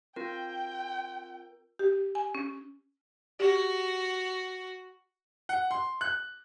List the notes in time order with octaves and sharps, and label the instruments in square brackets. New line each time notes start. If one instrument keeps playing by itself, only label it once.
[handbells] C4 F4 [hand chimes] A#4 [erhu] G5
[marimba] G4
G#5
C#4
[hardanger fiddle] F#4 [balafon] G4
[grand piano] F#5
C6
F#6